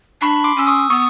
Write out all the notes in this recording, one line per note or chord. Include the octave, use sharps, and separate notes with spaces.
D4 B5 C#6
C6 D6
C#4 E6
C#6 D#6
B3 C#6 D#6